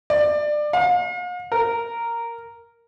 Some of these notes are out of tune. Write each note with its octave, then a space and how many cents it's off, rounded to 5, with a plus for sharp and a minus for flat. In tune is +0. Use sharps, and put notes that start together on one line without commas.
D5 +25
F5 +45
A#4 -5